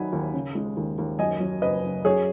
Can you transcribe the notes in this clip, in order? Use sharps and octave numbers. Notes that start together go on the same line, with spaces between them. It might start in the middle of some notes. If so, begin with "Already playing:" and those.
Already playing: D#3 F#3 D#4 F#5 G#5 B5
D#2
C#3
G#3
D#2
D#2
F#2 D#5 G#5
F#3
F#1 B4 D#5
F#1
F#2 G#4 C#5